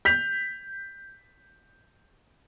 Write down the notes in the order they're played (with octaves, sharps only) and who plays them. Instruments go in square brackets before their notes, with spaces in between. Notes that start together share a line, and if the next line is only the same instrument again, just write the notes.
[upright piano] G6 B6 F7